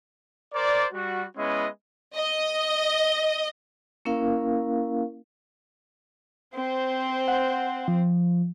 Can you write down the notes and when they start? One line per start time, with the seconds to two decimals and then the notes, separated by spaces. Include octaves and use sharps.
0.54 A#4 C5 D5
0.93 G3 F#4
1.36 G#3 B3 C#4 E4 D#5
2.16 D#5
4.05 A#3 C#4 E4 A#4 F5
6.55 C4 C5
7.28 F#5
7.88 F3